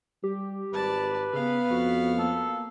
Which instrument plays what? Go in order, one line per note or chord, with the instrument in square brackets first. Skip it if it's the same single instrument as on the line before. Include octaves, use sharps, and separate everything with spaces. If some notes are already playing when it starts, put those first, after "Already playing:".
[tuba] G3 [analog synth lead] G4
[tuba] G#1 [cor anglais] B4 [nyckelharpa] D5 A5
[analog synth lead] C#3 [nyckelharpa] B3 F5
[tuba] F2 [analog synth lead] F#4
[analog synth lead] A#3 [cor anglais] A4